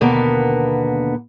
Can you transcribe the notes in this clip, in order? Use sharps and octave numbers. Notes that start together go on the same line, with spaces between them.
D#2 B2 D3 A#3 B3